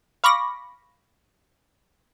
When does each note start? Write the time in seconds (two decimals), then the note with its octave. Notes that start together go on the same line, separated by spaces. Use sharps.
0.24 F5 B5 C#6 D6 A#6